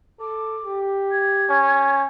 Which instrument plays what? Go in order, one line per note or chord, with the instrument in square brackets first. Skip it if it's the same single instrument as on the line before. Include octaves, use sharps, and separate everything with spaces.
[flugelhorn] A4 [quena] D6
[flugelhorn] G4
[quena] G#6
[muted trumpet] C#4